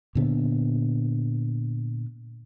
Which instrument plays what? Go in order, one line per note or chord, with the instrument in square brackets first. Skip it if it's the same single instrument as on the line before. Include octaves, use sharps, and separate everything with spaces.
[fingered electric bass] A#2 D3 B3